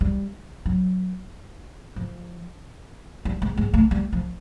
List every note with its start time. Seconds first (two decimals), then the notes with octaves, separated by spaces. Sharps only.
0.01 G3
0.66 F#3
1.96 F3
3.25 G3
3.42 G#3
3.57 G#3
3.74 A3
3.91 G3
4.13 F3